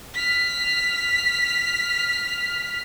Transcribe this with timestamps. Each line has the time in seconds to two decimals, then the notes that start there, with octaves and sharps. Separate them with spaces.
0.14 F6 B6